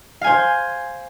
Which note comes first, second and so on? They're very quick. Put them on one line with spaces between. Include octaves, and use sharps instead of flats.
F5 G#5 C5